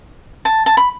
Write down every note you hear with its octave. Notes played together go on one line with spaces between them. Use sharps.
A5
A5
B5